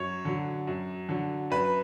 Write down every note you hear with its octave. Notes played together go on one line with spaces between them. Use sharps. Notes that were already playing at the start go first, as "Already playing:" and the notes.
Already playing: F#2 C#5
D3 F#3
F#2
D3 F#3
F#2 B4